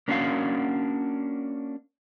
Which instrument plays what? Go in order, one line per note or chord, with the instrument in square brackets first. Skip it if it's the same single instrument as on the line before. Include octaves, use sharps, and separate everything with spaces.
[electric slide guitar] A#3 C#4 D4 F#4 B4 F5